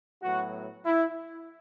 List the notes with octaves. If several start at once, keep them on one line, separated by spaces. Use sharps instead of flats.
A2 F#3 B3 F#4
E4